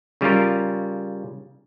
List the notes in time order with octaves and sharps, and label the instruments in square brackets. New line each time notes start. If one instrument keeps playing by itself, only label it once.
[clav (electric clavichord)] C#3 G3 C#4 F4 A#4